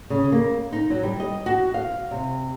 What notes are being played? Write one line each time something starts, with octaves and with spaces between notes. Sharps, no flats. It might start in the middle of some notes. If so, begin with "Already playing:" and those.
C#3
A#3
D#4
F#3
G3
D#5
F#4
F5
C3